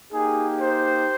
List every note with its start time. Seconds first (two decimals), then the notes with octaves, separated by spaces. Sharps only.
0.12 A#3 D#4 G4 G#4
0.61 C5